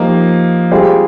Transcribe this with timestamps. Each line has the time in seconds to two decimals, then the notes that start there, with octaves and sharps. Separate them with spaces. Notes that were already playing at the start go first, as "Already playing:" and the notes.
Already playing: F3 A#3 D#4 G4
0.71 G3 C4 F4 G#4